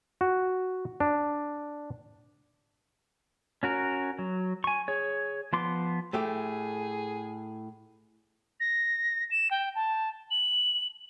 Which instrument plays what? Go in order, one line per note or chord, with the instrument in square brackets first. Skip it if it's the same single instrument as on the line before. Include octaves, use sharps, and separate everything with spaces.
[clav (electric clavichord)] F#4
D4
[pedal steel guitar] C#4 F#4 A#4
F#3
G#5 C#6
G#4 C#5
F3 B3 C6 D6
[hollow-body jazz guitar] A2 A3 G4 [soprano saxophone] G#4
[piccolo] A#6
E7
G5
A5
F#7